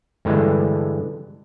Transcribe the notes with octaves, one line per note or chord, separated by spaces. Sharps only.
G2 D3 E3 G#3